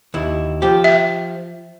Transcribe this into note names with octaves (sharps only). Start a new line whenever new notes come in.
D#2 E4
F3 G4
E5